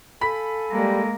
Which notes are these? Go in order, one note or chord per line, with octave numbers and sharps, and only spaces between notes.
A4 F5 G#5 B5 B6
G3 G#3 A#3